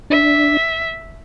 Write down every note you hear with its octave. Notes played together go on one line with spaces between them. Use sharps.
D4 E5